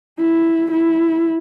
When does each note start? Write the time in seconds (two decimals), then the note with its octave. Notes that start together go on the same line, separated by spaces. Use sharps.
0.19 E4
0.71 E4